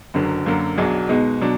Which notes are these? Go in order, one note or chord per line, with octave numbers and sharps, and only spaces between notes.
F#1 F#2 D3 F#3
F#2 D3 F#3 A#3
B1 B2 F#3 D4 G#4
B2 G#3 B3 D#4
B2 F#3 D4